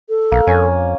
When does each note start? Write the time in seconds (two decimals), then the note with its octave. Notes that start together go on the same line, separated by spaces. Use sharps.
0.09 A4
0.32 B1 A#3
0.47 F2 C#4 G#5